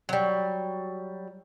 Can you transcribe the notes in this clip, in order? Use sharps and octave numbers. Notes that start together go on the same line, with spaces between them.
F#3 G3